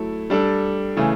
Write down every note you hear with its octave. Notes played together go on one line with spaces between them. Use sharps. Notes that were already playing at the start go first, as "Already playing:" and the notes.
Already playing: F#3 A3 E4 A4
G3 D4 A4
C#3 E3 A3